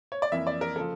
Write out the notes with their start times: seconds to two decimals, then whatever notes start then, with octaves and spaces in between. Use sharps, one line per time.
0.12 C#5
0.22 D5
0.32 F2 E3 A#3 E5
0.47 D5
0.61 A#4
0.76 C#3 F3 A4